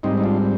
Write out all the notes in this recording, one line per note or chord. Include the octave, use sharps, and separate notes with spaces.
G#2 G3 C4 D#4
D#4
D4 F4